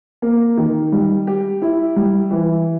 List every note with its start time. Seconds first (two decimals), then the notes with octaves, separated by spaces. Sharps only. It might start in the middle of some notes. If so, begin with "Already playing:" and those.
0.22 A#3
0.57 D#3
0.92 G3
1.27 G4
1.62 E4
1.96 G3
2.31 E3